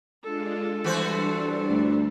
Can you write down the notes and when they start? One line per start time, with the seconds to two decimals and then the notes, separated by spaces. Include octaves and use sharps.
0.24 G#3 D4 F4 A4
0.84 E3 G3 D4 F#4 C5
1.69 D2